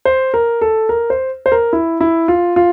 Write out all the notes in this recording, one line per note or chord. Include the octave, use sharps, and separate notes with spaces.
C5
A#4
A4
A#4
C5
C5
A#4
E4
E4
F4
F4